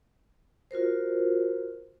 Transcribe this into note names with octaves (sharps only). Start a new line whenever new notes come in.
F4 F#4 A#4 C5